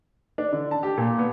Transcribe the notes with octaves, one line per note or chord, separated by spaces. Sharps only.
D4
D3
A5
G4
A#2
B3